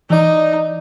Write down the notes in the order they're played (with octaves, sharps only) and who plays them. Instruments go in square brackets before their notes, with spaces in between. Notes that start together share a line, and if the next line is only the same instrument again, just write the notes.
[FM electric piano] E3 D5 [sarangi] D#4